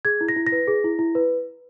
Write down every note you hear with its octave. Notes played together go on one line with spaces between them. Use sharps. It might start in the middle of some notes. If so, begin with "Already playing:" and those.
G#4 G#6
E4
A#6
E4
A#6
B4
G#4
E4
E4
B4